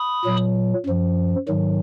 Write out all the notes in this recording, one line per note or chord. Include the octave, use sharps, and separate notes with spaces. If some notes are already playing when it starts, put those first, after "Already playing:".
Already playing: B5 D#6
A#2 F#3
F#2 F3
G#2 D#3 F#3